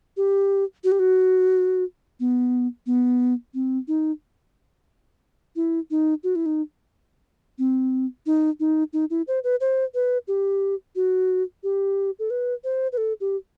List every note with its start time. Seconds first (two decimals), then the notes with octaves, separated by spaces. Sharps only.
0.17 G4
0.84 F#4
0.92 G4
0.99 F#4
2.20 B3
2.86 B3
3.54 C4
3.88 D#4
5.56 E4
5.91 D#4
6.24 F#4
6.36 E4
6.46 D#4
7.59 C4
8.26 D#4
8.60 D#4
8.93 D#4
9.10 E4
9.28 C5
9.44 B4
9.61 C5
9.94 B4
10.28 G4
10.96 F#4
11.63 G4
12.19 A4
12.30 B4
12.64 C5
12.92 B4
12.97 A4
13.21 G4